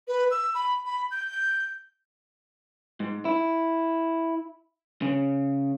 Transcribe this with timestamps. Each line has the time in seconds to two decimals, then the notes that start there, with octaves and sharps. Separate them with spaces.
0.08 B4
0.31 E6
0.55 B5
0.85 B5
1.11 G6
3.00 G#2
3.25 E4
5.02 C#3